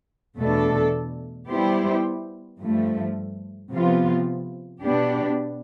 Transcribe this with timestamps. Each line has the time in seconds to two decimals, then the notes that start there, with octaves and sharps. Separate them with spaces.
0.38 E2 B2 A3 D4 A4
1.50 G3 B3 E4 G4 C5
2.61 G2 F3 A3
3.73 C3 F3 B3 F4
4.83 B2 B3 D4 G4